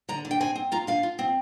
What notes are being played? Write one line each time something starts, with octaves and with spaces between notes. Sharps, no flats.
D3 A#5
D3
G5
C4 G#5
C4
F4 A#5
D3 F5
F4
C4